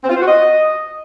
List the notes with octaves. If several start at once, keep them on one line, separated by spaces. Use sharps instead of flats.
C4
F4
C5
F#4
D#5